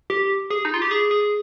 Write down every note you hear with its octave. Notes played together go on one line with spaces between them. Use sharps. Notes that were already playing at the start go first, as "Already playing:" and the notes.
G4
G#4
D#4
F4
G4
G#4
G#4